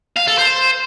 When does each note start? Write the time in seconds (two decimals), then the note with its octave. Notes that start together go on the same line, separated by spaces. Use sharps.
0.17 F5
0.28 A4
0.38 C5